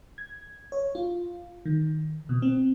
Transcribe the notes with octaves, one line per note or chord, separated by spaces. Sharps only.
G#6
C#5
F4
D#3
B2
C4